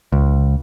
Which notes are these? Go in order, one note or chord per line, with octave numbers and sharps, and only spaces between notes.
C#2